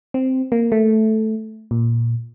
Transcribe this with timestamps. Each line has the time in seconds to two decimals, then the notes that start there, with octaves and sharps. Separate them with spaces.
0.14 C4
0.52 A#3
0.72 A3
1.71 A#2